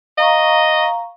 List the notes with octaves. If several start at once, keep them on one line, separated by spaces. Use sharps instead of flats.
D#5 F5 A#5 C#6